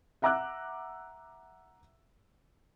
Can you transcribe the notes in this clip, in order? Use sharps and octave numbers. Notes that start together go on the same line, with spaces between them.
E5 F#5 A#5 D6 E6 F#6